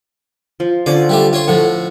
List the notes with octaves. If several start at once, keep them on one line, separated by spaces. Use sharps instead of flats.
F3
D3 F3 C#4 D5
G3 A3 G4
F4 C#5 C6
A2 D3 F3 C#5